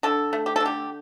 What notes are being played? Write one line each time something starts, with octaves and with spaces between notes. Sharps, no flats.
D3 A4
A3
G4
A4
D3
G4